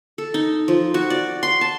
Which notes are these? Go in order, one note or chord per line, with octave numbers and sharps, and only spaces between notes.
A4
D#4
F3
F#4
D5
C6
A5